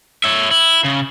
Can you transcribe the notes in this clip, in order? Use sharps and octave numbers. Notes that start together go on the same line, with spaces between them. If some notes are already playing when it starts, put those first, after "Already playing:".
C#5 E5
E4
C#3